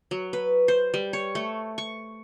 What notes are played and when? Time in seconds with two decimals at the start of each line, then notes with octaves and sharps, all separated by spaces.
0.11 F#3
0.33 B4
0.68 C5
0.94 G3
1.13 C#5
1.35 A3
1.78 C#6